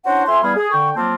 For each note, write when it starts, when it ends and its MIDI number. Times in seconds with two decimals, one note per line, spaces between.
0.06 0.24 61
0.06 0.24 62
0.06 0.24 64
0.06 0.24 66
0.06 0.24 72
0.06 0.24 78
0.27 0.41 41
0.27 0.41 76
0.27 0.41 80
0.27 0.41 84
0.43 0.54 52
0.43 0.54 55
0.43 0.54 59
0.43 0.54 68
0.43 0.54 77
0.43 0.54 83
0.57 0.70 68
0.72 0.91 50
0.72 0.91 79
0.72 0.91 85
0.96 1.15 53
0.96 1.15 54
0.96 1.15 58
0.96 1.15 60
0.96 1.15 65
0.96 1.15 81